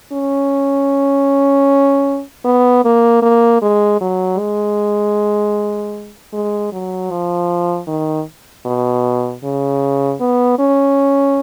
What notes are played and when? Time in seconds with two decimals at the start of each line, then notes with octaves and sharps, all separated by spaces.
0.12 C#4
2.45 B3
2.85 A#3
3.22 A#3
3.62 G#3
4.01 F#3
4.39 G#3
6.33 G#3
6.72 F#3
7.11 F3
7.87 D#3
8.66 B2
9.43 C#3
10.20 B3
10.59 C#4